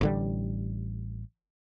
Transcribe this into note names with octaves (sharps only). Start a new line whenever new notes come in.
A1 D3 G3